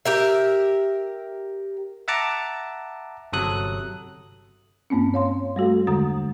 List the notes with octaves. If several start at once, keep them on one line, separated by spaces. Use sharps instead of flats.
G4 A#4 E5
E5 F#5 A5 A#5 D6
G1 C3 F#3 A4 D#6 F#6
G2 A#3 C4 C#4
C#5 F5 C6
G3 A3 F#4 A4
E2 D3 G#3 A#5 D#6